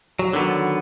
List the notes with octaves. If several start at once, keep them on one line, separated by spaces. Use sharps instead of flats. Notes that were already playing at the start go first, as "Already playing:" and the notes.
F#3
D3 D#3 F#3 B3